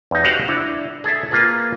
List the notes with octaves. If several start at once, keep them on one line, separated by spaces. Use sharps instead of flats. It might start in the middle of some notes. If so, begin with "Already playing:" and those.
E2 D#4
F#4 G4 C5 D#5 F5 F#5
D4 E4
G#4 A4 D5 E5
A#3 F4 G#4 B4